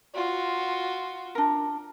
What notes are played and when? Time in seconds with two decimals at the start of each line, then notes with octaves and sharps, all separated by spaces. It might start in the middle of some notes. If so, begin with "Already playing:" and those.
0.14 F4 F#4
1.35 D4 A#4